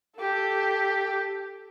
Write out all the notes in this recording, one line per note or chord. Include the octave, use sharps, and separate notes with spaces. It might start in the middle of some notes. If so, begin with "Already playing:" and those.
G4 A4